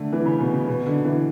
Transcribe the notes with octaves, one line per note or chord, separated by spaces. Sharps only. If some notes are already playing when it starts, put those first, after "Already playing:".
Already playing: D3 A3
E3
C#3
B2
C#3
B2
D3
E3